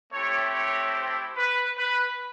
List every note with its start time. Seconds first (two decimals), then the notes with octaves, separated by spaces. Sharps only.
0.12 A3 C4 E4 G4 C#5
0.53 C#5
0.94 C5
1.37 B4
1.78 B4